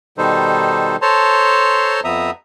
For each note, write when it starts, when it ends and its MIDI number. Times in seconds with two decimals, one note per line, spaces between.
0.18 0.96 47
0.18 0.96 51
0.18 0.96 55
0.18 0.96 63
0.18 0.96 69
0.18 0.96 72
1.02 2.00 69
1.02 2.00 72
1.02 2.00 73
1.02 2.00 81
1.02 2.00 82
1.02 2.00 84
2.04 2.31 41
2.04 2.31 53
2.04 2.31 59
2.04 2.31 76
2.04 2.31 82
2.04 2.31 87